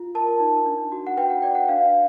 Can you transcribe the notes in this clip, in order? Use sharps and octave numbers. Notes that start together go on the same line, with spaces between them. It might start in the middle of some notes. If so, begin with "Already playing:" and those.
Already playing: F4
A#4 A5
D#4
D4
F#4
F#5
B4 G5
F#5
D5 G5
F#5
D4 F5